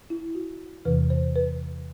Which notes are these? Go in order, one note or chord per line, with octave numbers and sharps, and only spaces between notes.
E4
F#4
E2 C3 E3 B4
C5
B4